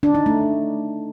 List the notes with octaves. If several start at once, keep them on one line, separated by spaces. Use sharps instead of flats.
D4
D#4
A3